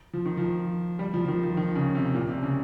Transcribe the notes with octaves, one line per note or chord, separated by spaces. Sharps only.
F3
D#3
F3
G3
F3
F3
D#3
F3
D#3
C#3
C3
A#2
C3
C#3